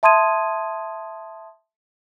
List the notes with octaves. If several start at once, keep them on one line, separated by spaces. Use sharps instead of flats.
E5 A5 C6 D#6 G#6 D#7